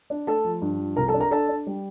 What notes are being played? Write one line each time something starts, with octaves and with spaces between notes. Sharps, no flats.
D4
A3 A4 A5
F3
G2
F3
C2 A#4 A#5
A4 A5
D4
A#4 A#5
D4 A4 A5
D4
G3